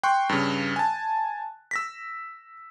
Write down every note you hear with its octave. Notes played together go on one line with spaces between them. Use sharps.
G5 C6 C#6 F#6
G2 C#3
G#5 A5
E6 A#6 B6